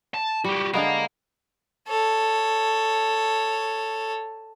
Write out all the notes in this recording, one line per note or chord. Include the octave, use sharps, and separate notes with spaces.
A5
G3 F#4 G4
D3 G#3 B3 F5 A#5
A4 C#5